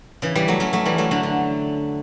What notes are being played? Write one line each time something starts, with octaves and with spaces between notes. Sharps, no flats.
C#3 E3
E3 G3
F#3 A3
A3 C#4
F#3 A3
E3 G3
F#3 A3
D3 F#3
D3